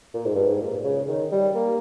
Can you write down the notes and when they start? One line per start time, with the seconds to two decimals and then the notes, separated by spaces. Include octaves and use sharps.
0.14 A#2
0.25 G#2
0.35 G2
0.46 G#2
0.61 A#2
0.84 C#3
1.08 D#3
1.32 G3
1.55 A#3